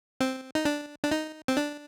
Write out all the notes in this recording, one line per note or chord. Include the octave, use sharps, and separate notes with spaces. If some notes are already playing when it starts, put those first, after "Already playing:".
C4
D#4
D4
D4
D#4
C4
D4